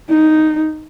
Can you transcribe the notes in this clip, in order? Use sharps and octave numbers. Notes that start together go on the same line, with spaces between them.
D#4